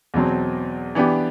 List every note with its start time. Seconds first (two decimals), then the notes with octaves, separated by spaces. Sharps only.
0.14 E2 B2 F#3 C4
0.95 E3 B3 D4 G4